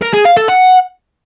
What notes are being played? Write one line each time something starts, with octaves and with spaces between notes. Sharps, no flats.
A#4
G#4
F5
A4
F#5